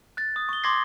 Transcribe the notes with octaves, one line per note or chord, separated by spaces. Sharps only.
F#6 A6
D#6
C#6 G7
C6 D6 D#6 G#6 A#6 C7